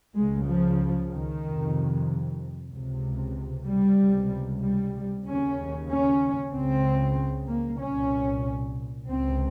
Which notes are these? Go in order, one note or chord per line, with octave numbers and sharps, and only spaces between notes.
C#2 C#3 G#3
F3
D#3
F2 C3
C#2 C3
G3
C#2 C3
G3
D#2 C#3 C#4
C#4
C#2 C#3 C4
A#3
C2 A#2 C#4
C#2 C3 C4